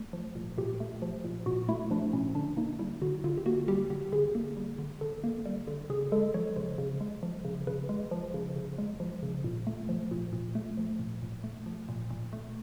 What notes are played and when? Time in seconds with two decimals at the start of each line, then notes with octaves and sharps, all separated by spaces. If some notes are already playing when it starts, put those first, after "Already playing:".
Already playing: A3
0.13 F3
0.35 A#2
0.58 A#2 G4
0.80 A3
1.02 F3
1.25 A#2
1.46 A#2 F#4
1.69 A3 E4
1.91 F3 D4
2.13 A#2 C#4
2.35 D3 D4
2.57 A#3 D#4
2.79 G3 E4
3.02 D3 F#4
3.24 D3 F4
3.37 G4
3.46 A#3 F#4
3.68 G3 G4
3.90 D3 G4
4.12 D3 G#4
4.35 A#3
4.57 G3
4.79 D3
5.01 D3 A4
5.24 A#3
5.46 G3
5.67 D3
5.90 C#3 G#4
6.12 G#3 A4
6.34 F3 C#5
6.56 C#3 C5
6.78 C#3
7.01 G#3
7.23 F3
7.45 C#3
7.67 C#3 B4
7.89 G#3
8.11 F3
8.34 C#3
8.56 C#3
8.78 G#3
9.00 F3
9.23 C#3
9.44 A#2
9.67 A3
9.89 F3
10.11 A#2
10.33 A#2
10.55 A3
10.77 F3
10.99 A#2
11.22 A#2
11.44 A3
11.66 F3
11.89 A#2
12.10 A#2
12.33 A3